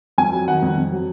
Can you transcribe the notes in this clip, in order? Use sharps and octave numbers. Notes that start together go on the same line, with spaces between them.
F2 G#5
F#3
D#3 F#5
F2
F2
F#3